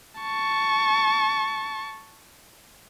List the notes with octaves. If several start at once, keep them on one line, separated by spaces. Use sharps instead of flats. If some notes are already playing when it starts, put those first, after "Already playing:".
A5 C#6